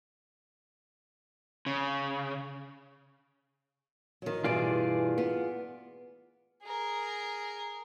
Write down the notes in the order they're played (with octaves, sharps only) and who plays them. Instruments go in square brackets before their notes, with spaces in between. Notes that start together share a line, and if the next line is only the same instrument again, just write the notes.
[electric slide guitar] C#3
[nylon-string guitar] D#3 F#3
[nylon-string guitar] G2 B2 E3 [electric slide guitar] F4 G#4 D5
[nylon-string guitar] B3
[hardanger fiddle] G#4 A#4